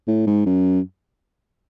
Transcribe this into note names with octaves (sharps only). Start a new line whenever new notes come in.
A2
G#2
F#2